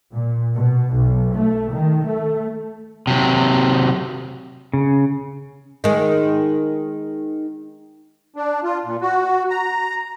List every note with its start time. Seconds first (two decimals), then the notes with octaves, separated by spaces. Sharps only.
0.13 A#2
0.57 B2
0.95 B1
1.35 A3
1.72 D#3
2.04 A3
3.07 C3 F#3
4.73 C#3
5.84 D#3 G#3
8.36 D4
8.63 F4
8.85 A#2
9.02 F#4
9.50 A#5